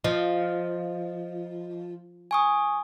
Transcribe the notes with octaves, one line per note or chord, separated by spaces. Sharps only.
F3 D#5
G#5 C#6 D#6